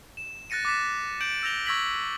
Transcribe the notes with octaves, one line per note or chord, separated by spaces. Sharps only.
E7
F#6 A6 A#6 C#7 D#7
D6 F#6 A6 B6 E7
G6 D7 F#7
E6 G6 A#6 F7 G7
C#6 E6 G#6 A#6 B6 F#7